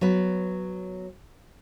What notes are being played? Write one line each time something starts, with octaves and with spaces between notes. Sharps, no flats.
F#3 B3 B4